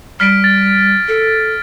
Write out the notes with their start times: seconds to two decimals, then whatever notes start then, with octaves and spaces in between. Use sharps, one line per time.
0.20 G3 F6 B6 D7
0.44 A6
1.08 A4